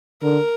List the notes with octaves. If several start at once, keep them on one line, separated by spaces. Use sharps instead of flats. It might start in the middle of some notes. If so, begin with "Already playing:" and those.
D3 A#4